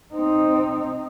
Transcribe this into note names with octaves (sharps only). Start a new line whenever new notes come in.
C4 D#4